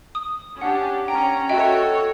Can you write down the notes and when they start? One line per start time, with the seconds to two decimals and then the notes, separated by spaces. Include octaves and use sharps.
0.15 D#6
0.61 C#4 D4 G4 F#5
1.08 C#4 G5 A#5
1.49 F#4 A4 C#5 D#5 E5 G5